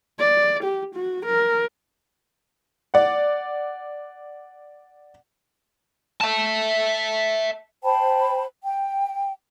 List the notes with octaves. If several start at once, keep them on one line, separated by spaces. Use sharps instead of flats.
D5
G4
F#4
A#4
D5 F#5
E5 A5
C5 G5 A5 B5
G5